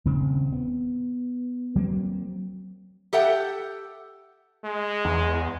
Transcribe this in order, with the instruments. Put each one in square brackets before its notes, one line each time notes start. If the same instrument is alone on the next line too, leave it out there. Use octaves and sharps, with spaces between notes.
[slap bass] D#1 C#3 C4
B3
F#3 A#3 C4
[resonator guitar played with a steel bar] G4 A4 E5 F#5 G5
[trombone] G#3
[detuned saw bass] E2